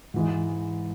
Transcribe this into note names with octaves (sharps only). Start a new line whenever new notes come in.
G#2 E3 G#3